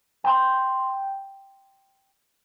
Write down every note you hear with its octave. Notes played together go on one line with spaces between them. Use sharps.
G5 C6